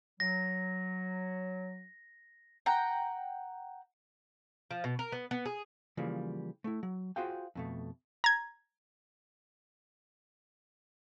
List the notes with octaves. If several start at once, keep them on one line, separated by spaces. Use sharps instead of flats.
F#3 A#6
F#5 G5 A#5
F3
B2
A#4
B3
B3
G#4
C#3 E3 F3 G3 A#3
A3 E4
F#3
F4 F#4 G#4 C5 F5 G5
F2 B2 A3
A#5 G#6